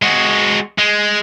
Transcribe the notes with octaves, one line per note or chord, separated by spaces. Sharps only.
G#3 F#4
G#3